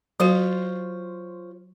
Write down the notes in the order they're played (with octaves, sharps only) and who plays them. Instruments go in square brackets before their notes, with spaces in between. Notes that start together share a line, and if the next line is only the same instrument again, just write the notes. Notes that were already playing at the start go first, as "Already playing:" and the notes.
[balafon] F#3 F#4 [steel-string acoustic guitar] F4 C5 C#5